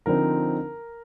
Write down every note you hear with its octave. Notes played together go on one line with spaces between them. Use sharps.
D3 F3 C4 D#4 A#4